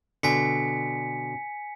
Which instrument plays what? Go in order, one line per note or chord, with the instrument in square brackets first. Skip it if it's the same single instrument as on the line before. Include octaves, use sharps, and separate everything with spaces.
[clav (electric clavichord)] B2 D3 [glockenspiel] G#5 B6 C#7